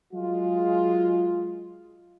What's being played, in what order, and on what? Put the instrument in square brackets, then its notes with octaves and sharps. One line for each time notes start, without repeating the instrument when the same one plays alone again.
[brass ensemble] F#3 G#3 F4